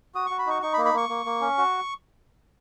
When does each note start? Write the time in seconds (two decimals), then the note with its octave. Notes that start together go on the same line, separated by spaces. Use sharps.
0.15 F#4 D#6
0.26 F#4 C#6
0.39 B5
0.47 D#4 C#6
0.62 D#4 C#6
0.73 B5
0.78 A#3
0.85 B5
0.94 A#3 C#6
1.09 A#3
1.26 A#3
1.41 C#4
1.58 F#4